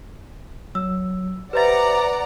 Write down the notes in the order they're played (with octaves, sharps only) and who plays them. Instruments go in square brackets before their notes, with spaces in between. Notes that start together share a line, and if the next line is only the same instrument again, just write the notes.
[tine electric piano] F#3 [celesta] E6
[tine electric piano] G4 C5 E5 [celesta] B4 A6 [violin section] D5 F#5 A#5